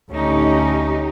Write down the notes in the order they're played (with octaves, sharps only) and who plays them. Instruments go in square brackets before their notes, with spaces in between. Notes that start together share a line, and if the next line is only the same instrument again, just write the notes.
[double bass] D2 C#4 [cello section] D#4 G4